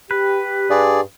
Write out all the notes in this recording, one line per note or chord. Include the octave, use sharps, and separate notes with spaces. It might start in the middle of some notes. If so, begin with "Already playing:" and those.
G4 B4
G2 G#4 D5